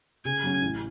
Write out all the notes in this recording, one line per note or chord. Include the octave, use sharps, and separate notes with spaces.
C#3 G#5
F#3 C#4
A1